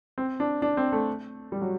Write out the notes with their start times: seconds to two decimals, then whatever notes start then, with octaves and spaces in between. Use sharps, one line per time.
0.18 C4
0.40 D4
0.62 D4
0.77 C4
0.92 A3
1.52 G3
1.61 F#3